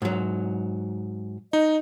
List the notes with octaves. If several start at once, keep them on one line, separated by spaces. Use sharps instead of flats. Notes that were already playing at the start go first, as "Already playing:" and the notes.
G#2 F#3
D#4 D#5